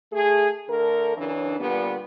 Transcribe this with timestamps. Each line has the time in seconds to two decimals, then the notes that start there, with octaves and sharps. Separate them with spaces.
0.12 A3 G#4
0.68 D3 A3 A#4
1.16 F#2 C#3 E3 D4
1.59 A#2 D3 G3 B3